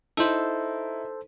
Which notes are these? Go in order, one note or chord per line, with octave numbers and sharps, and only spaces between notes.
D#4 E4 A4 C5